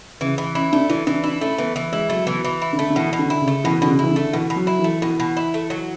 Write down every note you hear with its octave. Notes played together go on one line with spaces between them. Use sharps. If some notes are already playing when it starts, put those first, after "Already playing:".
C#3 E3
E3
C#4 E4
A3 D4
E3 E4
E3 D4
D4 E4
A3 C#4
E3 B3
E3
G#3 E4
F#3 A3
B2 E3
E3
E4
D3
A3
D3
B2 E3
B2
D3
E4
C#3
A3
B2 E3
B2 D3
C#3
E3 E4
D3
A3
B2 E3
B2
F#3
E4
E3
A3
B2 E3
B2
E4
A3
F#3